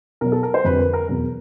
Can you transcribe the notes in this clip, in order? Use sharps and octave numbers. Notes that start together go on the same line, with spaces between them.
B2 F#3 A#4
A4
A#4
C5
F2 D3 G3 B4
A#4
A#4
E2 B2 F#3 A#4